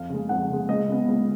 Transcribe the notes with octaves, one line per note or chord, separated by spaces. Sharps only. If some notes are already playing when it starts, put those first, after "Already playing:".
Already playing: F2 F5
C#3 G#3
F2 F#5
C#3 G#3
C#2 D#5
C#3 G#3 B3
C#2